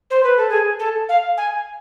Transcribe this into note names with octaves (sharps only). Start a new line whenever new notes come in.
C5
B4
A4
G#4
A4
F5
G#5